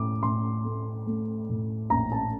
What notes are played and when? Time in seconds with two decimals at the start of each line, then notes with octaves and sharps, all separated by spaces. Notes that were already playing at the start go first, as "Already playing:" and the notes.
Already playing: A2 D6
0.22 A2 C6
0.65 A3
1.07 A3
1.49 A2
1.90 A#1 A#5
2.12 A5